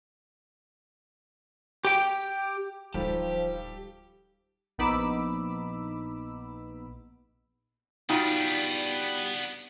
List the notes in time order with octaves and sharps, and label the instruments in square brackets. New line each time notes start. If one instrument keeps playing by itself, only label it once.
[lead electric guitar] G4 G5
[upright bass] D1 [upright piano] D#3 G3 A4 [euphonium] F3 [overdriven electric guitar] G4
[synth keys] A#1 B3 D#4 B5 D6 E6
[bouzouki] G3 [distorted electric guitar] B3 D4 [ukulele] D#4 F4 F#4